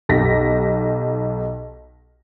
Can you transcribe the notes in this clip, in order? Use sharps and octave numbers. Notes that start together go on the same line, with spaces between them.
B1 G4 A#6 B6